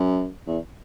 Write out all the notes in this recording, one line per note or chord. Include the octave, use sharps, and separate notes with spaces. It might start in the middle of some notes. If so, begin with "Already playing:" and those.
Already playing: F#2
E2